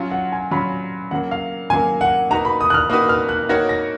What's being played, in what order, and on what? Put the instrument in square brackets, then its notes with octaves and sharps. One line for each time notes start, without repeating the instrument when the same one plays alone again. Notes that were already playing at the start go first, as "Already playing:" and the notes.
Already playing: [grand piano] F#3 C#4 F4
[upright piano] F#5
G#5
[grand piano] F#3 C#4 F4 [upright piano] B5
[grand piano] C#3 F#3 A#3 [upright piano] F#5
[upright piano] F5
[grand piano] C#3 F#3 A#3 [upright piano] G#5
[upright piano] F#5
[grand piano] A#3 D#4 F#4 B4 [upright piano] A#5
[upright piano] B5
D#6
F#6
F6
[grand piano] A#3 D#4 F#4 B4 [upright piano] D#6
[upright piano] F6
F#6
[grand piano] A#3 D#4 F#4 A#4 C#5 [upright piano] A#6
[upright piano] A#6